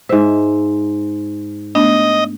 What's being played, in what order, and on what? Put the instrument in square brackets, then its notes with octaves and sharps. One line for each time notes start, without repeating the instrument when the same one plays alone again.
[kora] G#2 E5 [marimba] C5
[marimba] A3 B3 D4 [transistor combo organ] D#5